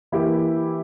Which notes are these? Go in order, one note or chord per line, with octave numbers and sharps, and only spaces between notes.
E3 A#3 E4 G4